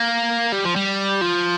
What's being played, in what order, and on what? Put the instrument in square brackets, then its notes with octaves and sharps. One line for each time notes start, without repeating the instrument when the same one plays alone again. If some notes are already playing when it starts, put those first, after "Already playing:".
Already playing: [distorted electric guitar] A#3
G3
F3
G3
F3